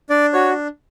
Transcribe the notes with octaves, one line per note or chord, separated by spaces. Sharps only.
D4 D5
F#4 C#5